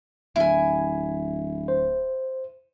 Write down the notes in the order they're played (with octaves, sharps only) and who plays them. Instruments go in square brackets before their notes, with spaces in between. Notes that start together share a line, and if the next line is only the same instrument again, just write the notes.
[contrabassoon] D1 [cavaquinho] E4 G#5
[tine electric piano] C5